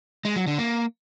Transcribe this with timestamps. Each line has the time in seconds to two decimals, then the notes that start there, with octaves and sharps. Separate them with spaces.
0.25 G#3
0.36 F#3
0.47 D3
0.58 A#3